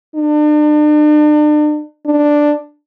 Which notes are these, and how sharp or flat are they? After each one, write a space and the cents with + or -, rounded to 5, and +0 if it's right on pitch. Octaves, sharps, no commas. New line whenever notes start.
D4 +40
D4 +5